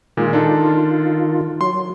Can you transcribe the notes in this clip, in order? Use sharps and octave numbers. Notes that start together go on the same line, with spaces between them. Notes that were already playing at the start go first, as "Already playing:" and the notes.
A#2 D#3 G#3 F4
D4 D#4 A4
F#3 C6